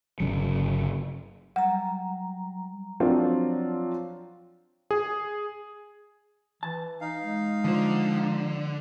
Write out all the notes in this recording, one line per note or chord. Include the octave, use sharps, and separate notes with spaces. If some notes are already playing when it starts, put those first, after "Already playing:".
G1 C#3 F#3
F#3 G3 F#5 A#5
F3 F#3 C4 D4 F4
G#4
E3 A5
D#4 F5
G#3
D3 F3 C5